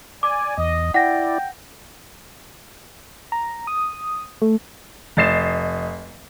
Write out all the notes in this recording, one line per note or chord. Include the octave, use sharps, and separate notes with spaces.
D5 G#5 D6
E2 D#5
E4 D5 F#5 G5 A#6
A#5
D#6
A3
F1 D#5 A6 C7 E7